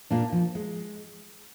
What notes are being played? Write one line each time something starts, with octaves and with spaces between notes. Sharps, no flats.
A#2 A#3 D4
F3
G#3